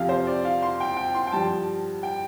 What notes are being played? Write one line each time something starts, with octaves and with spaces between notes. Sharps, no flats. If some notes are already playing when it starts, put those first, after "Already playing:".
Already playing: F2 C3 F3 F5
C5
D5
F5
C6
G5
G5
C6
G5
G2 F3 A5
G5